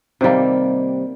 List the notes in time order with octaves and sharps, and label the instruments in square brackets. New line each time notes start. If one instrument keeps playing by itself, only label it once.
[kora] C3 D#3 G3 A#3